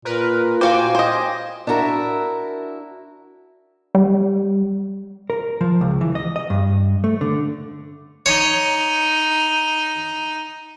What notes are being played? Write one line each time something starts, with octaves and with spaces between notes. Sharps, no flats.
A#2 A#4 B4
F#4 C5 F5 G5 G#5 D6
C5 D#5
D4 E4 F#4 A#4 E5
G3
A#4
F3
C#2
E3
D#5
D#5
G2
A3
D3
D#4 C#5